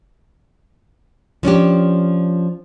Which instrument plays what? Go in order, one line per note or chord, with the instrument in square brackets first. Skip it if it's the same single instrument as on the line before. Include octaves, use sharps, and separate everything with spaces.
[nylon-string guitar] F3 C#4 D4 G4